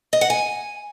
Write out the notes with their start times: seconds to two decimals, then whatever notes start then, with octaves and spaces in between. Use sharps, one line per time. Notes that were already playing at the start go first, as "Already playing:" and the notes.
0.13 D#5
0.21 F#5
0.30 G#5